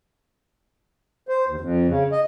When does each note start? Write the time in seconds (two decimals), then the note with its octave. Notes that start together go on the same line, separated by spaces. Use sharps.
1.28 C5
1.48 D#2
1.61 F2
1.88 C#3
2.12 D#5